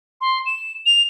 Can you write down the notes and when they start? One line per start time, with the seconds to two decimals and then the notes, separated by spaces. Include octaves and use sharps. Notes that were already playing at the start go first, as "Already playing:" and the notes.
0.21 C6
0.46 E7
0.86 F7